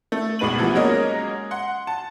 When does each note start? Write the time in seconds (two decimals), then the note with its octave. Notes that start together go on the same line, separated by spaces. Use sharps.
0.12 A3
0.39 B1 A2 G#3 B4 D#7 F#7
0.58 E3 F3 G3 B3
0.75 F#3 G#3 A#3 C#4 A#4 D#5
1.51 F#5 C6
1.87 A5